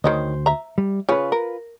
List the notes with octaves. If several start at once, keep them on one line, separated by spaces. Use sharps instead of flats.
D2 D#3 C5 C#5 D#5
E5 A#5
G3
C#3 C#4 F4 B4
A#4